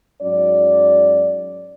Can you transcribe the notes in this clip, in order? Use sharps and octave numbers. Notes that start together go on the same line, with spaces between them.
G#2 F#3 C#4 D5